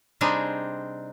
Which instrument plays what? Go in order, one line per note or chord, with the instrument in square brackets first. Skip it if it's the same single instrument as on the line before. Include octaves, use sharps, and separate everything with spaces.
[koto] C3 G3 C4 D4 D#4 G#4